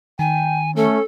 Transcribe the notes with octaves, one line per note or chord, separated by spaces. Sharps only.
D#3 G5 G#5
A3 C#4 A4